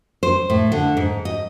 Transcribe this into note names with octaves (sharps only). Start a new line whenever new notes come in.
C5
A2
D3
G#2
D#5